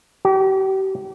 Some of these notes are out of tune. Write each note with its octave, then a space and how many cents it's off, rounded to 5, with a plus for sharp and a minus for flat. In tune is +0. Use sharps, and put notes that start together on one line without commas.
G4 -40